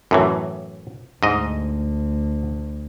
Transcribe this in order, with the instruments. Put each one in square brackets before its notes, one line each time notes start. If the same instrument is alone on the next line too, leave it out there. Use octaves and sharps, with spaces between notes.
[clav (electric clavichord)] F#2 A2 E3
[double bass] D2 [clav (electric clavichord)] G#2 D#5